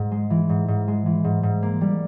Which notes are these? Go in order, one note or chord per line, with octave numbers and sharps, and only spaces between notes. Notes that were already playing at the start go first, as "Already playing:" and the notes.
Already playing: G#2
G#3
E3
G#2
G#2
G#3
E3
G#2
G#2
A#3
G3